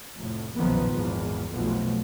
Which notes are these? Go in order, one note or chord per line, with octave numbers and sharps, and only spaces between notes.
F1 A2
F#1 B1 A#2 D#3 F3 B3
G#1 E2
F1 B1 B2 F3 A3